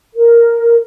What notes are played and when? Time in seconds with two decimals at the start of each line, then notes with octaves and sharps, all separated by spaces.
0.15 A#4